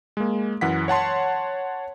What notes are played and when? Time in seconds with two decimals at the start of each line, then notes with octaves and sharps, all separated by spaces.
0.17 G#3 A#3
0.61 F#2 E3 F#5 B6
0.88 C#5 F#5 A5 C6